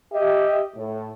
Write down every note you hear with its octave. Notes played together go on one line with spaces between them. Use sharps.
G4 D#5 E5
A2